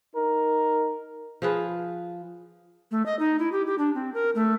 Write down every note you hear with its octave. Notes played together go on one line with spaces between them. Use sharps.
D#4 A#4
F3 G#4 B4
A3
D#5
D#4
E4
G4
G4
D4
C4
A#4
A3